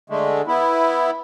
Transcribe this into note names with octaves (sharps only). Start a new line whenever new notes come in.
D3 G#3 A3
B3 E4